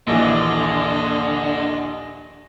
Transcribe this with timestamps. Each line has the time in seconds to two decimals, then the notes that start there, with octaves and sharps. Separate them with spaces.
0.07 A#1 D#2 D3 E3 A#3 D#5